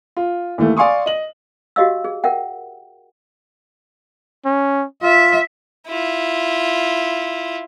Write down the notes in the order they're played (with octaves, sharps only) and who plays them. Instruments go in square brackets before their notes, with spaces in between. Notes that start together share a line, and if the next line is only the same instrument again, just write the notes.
[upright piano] F4
D#2 E3 A3
D5 F5 G#5 C6 C#6 D#6
D#5 F#7
[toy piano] F#4 G4 D#5 F5 E6
G#4
A#4 E5 F#5 G5
[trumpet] C#4
[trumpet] F4 [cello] E5
[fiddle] E4 F4